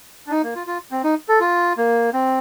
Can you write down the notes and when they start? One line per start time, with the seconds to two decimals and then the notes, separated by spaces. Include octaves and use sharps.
0.27 D4
0.31 D#4
0.43 A#3
0.55 F4
0.67 F4
0.91 C4
1.04 D#4
1.29 A4
1.40 F4
1.77 A#3
2.13 C4